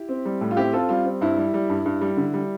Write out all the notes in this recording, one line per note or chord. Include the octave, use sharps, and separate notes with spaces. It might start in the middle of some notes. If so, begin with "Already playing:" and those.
Already playing: E4 G4
C4
G3
A2
F4
C4 E4 G4
C4 F4 A4
G3 F4
C4
G2 E4
G3
G3
G2
G2
G3
D3
G3